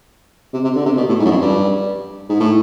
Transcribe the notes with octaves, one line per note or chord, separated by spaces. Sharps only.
C3
C3
D3
C3
B2
A2
G#2
F#2
F2
G2
G#2
A2